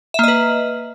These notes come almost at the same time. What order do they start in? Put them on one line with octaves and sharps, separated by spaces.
E5 A#3 D#5 B4